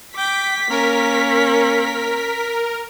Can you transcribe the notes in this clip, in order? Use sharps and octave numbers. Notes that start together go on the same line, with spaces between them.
G5 D6 B6
A#3 C#4 A#4